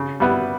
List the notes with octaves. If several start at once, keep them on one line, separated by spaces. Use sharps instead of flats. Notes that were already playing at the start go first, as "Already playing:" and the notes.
Already playing: C#3
G3 B3 E4 B4